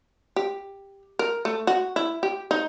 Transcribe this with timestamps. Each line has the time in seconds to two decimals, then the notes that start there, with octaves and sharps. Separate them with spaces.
0.36 G4
1.19 A#4
1.45 A3
1.67 F#4
1.96 E4
2.23 G4
2.51 D#4